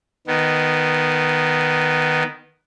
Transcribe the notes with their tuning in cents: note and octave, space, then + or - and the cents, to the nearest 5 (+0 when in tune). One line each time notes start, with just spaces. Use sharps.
D#3 -5 B3 +0